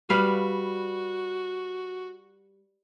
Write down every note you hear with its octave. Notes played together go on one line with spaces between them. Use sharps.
G3 F#4 B4 F5